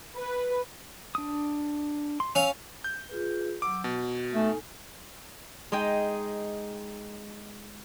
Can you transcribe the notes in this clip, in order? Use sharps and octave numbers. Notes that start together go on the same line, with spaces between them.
B4
D4 D#6
C6
C#4 F5 E6
G6
F4 G#4 B4
F#3 F#5 D6 E6
B2 F#4
A3 D#4 A4 G#5
G#3 D#4 D#5 G5